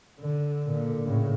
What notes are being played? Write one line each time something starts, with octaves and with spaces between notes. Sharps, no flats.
D3
A#2 D3
A2 C#3